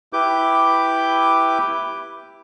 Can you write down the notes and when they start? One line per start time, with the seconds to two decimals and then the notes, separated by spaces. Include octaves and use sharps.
0.13 E4 G4 B4 D6 G6